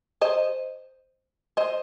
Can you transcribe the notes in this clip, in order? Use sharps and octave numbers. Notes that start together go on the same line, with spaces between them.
C5 D#5
C5 D#5